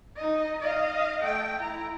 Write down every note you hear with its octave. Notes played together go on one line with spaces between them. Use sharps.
D#4 D#5
D#5 F5
A3 G5
E4 A#5